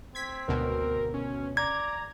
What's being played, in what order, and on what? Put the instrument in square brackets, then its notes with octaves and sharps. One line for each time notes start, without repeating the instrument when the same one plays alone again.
[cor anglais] C4 [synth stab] G#6 B6
[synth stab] G#1 D2 B2 [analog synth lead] A#4
[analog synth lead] C#4
[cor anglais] D5 [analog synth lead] A#5 [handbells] G#6